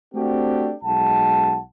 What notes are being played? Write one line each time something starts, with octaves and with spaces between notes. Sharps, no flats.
A3 C4 D4 F#4 G4 A4
B1 G#3 F#5 A5